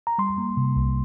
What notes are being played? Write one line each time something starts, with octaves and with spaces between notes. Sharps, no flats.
A#5
G3 C6
A#3
C3
C2